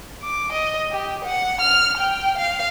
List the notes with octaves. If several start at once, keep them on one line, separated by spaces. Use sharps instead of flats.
D6
D#5
G4
F#5
F6
G5
F5